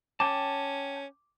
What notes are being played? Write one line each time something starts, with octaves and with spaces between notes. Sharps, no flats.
C#4 G5 A5 D6